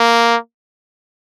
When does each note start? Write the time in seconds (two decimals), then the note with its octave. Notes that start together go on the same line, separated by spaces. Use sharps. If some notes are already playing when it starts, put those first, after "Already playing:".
Already playing: A#3